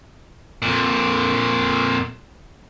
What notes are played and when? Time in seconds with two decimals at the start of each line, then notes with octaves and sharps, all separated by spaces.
0.62 F2 A#2